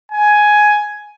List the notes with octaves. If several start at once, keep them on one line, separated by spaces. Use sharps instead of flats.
G#5